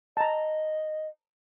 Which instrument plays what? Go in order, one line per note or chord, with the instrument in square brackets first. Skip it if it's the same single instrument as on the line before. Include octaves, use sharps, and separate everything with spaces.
[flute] D#5 [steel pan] A5 A#5